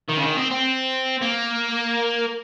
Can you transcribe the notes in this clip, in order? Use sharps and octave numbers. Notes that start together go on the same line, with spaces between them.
D#3
C#3
D#3
C4
C4
A#3